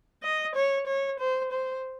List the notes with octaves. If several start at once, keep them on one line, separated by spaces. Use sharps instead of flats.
D#5
C#5
C#5
C5
C5